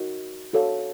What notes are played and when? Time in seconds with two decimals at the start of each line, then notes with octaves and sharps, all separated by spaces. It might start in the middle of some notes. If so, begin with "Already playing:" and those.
Already playing: D#4 F#4 A#4 D#5
0.53 F#4 A4 C#5 F5